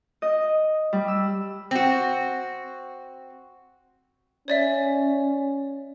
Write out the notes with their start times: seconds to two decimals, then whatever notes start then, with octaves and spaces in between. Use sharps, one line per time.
0.22 D#5
0.93 G3
1.08 E6
1.71 C4 F#4
4.48 C#4 C#5 D5 E5